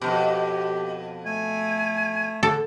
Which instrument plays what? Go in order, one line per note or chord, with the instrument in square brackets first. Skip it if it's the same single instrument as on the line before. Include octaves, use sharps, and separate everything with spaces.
[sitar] F2 G#2 B2 [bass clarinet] G4
[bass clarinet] A3 [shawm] G#5
[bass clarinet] D3 [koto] A4